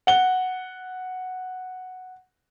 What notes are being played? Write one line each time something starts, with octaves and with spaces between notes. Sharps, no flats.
F#5 G7